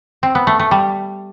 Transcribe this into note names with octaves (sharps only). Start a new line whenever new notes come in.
C4
B3
A3
A3
G3